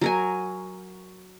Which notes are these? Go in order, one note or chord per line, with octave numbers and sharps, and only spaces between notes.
F#3 A#4 G#5